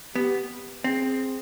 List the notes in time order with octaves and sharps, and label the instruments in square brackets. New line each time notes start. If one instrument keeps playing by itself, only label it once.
[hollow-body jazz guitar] B3 [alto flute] G4
[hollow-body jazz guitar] C4 [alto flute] G#4